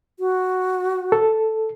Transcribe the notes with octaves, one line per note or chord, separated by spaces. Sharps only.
F#4
A4